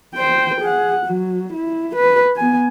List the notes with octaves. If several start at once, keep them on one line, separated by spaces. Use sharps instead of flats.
C5 G5
G#4 F#5
F#3
E4
B4
B3 G#5